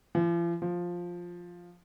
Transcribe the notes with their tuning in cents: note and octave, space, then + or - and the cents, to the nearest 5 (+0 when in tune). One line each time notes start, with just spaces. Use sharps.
F3 -45
F3 +5